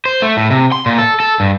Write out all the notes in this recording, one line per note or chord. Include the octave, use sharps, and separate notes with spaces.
C5
A3
A2
C3
C6
A#2
A4
A4
G2